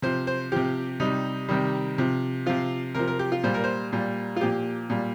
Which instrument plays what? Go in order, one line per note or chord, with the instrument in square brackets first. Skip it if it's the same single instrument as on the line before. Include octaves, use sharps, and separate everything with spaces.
[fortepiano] C3 F3 C5
C5
C3 F3 G4
C3 G3 D#4
C3 D#3 G3
C3 F3
C3 F3 F4
C3 F3 A#4
A#4
G4
F4
A#2 G3 C5
A#4
C5
A#2 G3
F4
A#2 F3 G4
A#2 G3